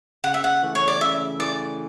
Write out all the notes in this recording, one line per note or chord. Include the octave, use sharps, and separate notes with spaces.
C#3 F#5
E5
F#5
E3 A3
C#5
D5
C#3 E5
E3 A3 D5